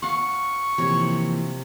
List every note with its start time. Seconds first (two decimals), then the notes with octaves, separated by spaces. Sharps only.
0.02 F5 F#5 C#6
0.78 C3 E3 F3 A#3 C#5